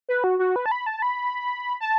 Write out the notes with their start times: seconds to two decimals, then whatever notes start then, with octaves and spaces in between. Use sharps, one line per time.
0.09 B4
0.24 F#4
0.39 F#4
0.56 B4
0.66 A5
0.72 B5
0.86 A5
1.02 B5
1.81 A5